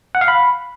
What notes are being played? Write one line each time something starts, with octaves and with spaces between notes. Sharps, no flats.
F#5
F5
B5